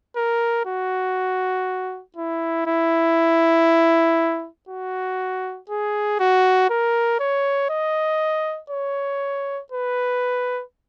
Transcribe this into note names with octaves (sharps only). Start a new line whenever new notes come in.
A#4
F#4
E4
E4
F#4
G#4
F#4
A#4
C#5
D#5
C#5
B4